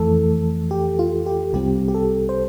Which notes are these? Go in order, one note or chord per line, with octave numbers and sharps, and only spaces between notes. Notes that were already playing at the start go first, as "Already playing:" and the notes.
Already playing: F2 E3 A3 A4
G4
F4
G4
C2 C3 G3 C4 G4
G4
A4
C5